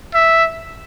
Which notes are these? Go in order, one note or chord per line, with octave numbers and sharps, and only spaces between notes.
E5